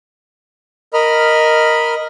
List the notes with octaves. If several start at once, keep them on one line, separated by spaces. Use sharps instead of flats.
A#4 D#5 B5 F6